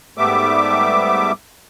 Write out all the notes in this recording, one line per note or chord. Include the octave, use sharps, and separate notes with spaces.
G#2 G3 A3 B3 E5 D6